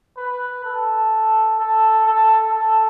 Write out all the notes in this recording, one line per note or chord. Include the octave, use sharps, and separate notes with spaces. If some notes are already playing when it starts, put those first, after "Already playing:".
B4
A4
A4
A4
A4